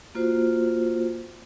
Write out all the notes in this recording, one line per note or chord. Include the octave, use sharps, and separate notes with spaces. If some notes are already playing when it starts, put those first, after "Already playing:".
A#3 F4 F#4 C5